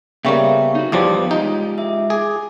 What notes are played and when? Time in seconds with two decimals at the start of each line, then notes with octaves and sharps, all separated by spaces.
0.25 C#3 G3 A#3 B3 E5 G5 C#6
0.75 D#4 F#4
0.92 E2 F3 G3 E4 B4 C#5 D6
1.31 G#3 D#4 F4 G4
1.78 E5
2.10 G#4 D6